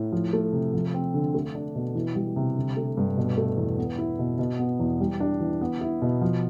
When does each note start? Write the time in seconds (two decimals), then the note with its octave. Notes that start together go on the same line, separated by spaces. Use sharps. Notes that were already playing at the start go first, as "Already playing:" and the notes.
Already playing: A2
0.12 F3
0.33 A3
0.53 C3
0.74 F3
0.94 C4
1.14 D3
1.34 A3
1.55 D4
1.75 B2
1.95 E3
2.15 G3
2.36 C3
2.56 D3
2.77 A3
2.97 G2
3.17 B2
3.38 A3
3.58 E2
3.78 B3
3.98 E4
4.19 B2
4.39 B2
4.59 B3
4.80 E2
5.00 G3
5.20 D4
5.40 E3
5.61 B3
5.81 E4
6.02 B2
6.21 F3